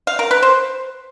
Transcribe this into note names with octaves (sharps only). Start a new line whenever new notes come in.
F5
A#4
B4
C5